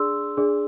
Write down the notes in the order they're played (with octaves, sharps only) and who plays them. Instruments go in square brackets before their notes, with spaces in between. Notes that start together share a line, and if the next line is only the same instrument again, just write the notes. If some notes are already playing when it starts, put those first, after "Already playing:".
Already playing: [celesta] D4 G#4 D5 C6 E6
D4 G#4 D5